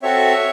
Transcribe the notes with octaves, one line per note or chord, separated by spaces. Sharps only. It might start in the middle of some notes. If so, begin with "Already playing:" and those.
C4 F#4 A4 C#5 E5